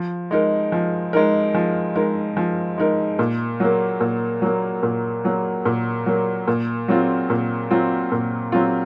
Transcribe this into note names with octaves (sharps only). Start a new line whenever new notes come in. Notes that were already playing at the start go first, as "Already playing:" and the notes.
Already playing: F3
G#3 D#4 A#4
F3
G#3 D#4 A#4
F3
G#3 D#4 A#4
F3
G#3 D#4 A#4
A#2
F#3 A#3
A#2
F#3 A#3
A#2
F#3 A#3
A#2
F#3 A#3
A#2
F#3 C4 F4
A#2
F#3 C4 F4
A#2
F#3 C4 F4